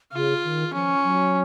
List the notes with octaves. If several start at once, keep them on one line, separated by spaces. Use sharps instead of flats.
C#3 F4
D#3
F3 C#4
F#3